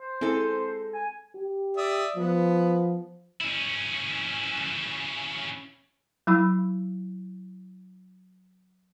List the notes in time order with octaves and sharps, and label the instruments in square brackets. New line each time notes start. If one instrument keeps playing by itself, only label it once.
[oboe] C5
[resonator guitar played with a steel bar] G#3 A4 [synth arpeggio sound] C4 E4 G#4
[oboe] G#5
[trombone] G4
[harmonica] D5 E5 D#6
[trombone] F3 [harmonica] B3
[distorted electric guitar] C#4 E4
[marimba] F#3 E4 B5 E6